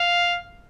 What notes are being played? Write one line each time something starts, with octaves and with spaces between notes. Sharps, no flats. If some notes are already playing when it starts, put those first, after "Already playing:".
Already playing: F5